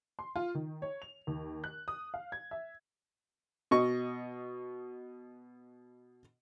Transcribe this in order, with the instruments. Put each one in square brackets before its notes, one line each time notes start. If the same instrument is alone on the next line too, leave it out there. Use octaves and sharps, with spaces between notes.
[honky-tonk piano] C6
F4
D#3
C#5
F7
D#2
F#6
D#6
F5
G#6
E5
[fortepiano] B2 D#5 C#6